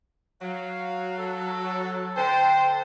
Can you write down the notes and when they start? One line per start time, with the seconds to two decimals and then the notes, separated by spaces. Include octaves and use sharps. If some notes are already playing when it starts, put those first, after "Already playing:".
0.42 F#3 F5
1.18 A4
2.17 D3 C5 G5 A5